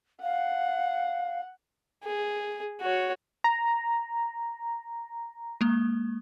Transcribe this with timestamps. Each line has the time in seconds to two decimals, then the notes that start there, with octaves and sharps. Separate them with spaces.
0.23 F5 F#5
2.04 G#4
2.82 F#4 C#5
3.44 A#5
5.61 G#3 A#3